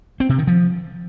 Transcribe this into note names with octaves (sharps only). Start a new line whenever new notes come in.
C4
C3
D#3
F3